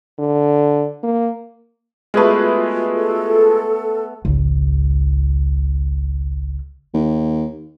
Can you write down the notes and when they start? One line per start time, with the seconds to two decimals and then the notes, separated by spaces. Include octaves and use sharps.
0.19 D3
1.03 A#3
2.14 G#3 A3 B3 F4 F#4 G#4 B4 E5
2.95 A4
4.25 G#1 C#2
6.94 D#2